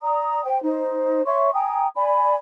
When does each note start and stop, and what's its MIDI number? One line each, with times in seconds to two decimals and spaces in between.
0.02 0.45 74
0.02 0.45 82
0.02 0.45 87
0.45 0.61 72
0.45 0.61 79
0.63 1.23 63
0.63 1.23 72
1.26 1.51 73
1.26 1.51 76
1.26 1.51 84
1.26 1.51 85
1.54 1.87 79
1.54 1.87 80
1.54 1.87 82
1.54 1.87 87
1.96 2.36 74
1.96 2.36 80
1.96 2.36 83